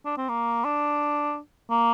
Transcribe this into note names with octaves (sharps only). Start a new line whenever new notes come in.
D4
C4
A#3
D4
A#3